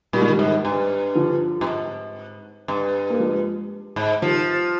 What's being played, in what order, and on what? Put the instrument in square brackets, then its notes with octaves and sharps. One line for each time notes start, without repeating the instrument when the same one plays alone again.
[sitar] A#2 [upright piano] G3
[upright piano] G#3
D#3 G3
[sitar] G#2
G2
[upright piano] D3 F3
[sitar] G2
G#2
G2
[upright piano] A#3
F3 G#3
[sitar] G#2
[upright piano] D#3 G3 [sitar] F3